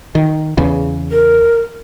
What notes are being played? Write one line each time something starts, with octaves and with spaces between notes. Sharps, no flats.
D#3
E2 C#3
A#4